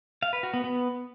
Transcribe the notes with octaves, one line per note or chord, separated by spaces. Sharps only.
F5
B4
F#4
B3
B3